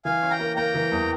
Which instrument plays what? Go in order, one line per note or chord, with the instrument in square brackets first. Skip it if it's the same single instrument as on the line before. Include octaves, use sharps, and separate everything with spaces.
[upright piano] E3 [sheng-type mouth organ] F5 G#5
[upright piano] C#4
[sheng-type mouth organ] G5 A#5
[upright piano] A#3
[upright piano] A#3 [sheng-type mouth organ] G5 A#5
[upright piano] E3
E2